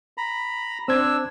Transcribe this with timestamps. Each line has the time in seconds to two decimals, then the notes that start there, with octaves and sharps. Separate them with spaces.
0.18 A#5 B5
0.88 C4 D4 C5 E6 G#6